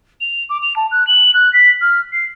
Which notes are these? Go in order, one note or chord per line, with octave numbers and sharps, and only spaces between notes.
F7
D6
F7
A5
F#6
F#7
F#6
B6
F6
C7